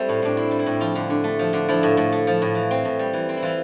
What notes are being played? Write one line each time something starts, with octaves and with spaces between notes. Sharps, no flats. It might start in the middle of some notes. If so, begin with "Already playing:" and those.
Already playing: G3 A3 C4 E4
A2
A2 D4
C4 E4
G3
E4
A2
F3 F4
D3
D3
A3
F3
D3
F3 E4
A2
A2
A3
F3
A2
E3
C4
A2
G3
E3
C4
E4
E3 F4